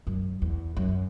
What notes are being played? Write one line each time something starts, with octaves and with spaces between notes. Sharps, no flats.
F#2
E2
F#2